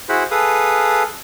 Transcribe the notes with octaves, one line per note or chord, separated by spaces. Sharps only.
E4 F#4 G#4 C5 F#5 B5
G#4 A4 B4 F5 D#6